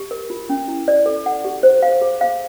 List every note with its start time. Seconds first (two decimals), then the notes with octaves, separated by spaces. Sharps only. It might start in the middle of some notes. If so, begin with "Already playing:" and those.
Already playing: G4
0.11 A#4
0.30 F4
0.49 C#4
0.68 E4
0.88 D5
1.06 A4
1.26 F#5
1.45 G4
1.63 C5
1.82 F5
2.02 G#4
2.21 F5